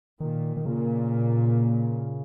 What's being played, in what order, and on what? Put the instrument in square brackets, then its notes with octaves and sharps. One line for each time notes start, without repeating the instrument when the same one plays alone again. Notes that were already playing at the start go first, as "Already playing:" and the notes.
[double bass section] A#2 [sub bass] D#3
[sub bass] D#3
[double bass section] A#2 [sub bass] C#3